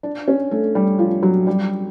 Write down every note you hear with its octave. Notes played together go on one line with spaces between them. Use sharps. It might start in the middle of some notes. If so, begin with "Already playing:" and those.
D4
C#4
A3
G3
F3
F#3
G3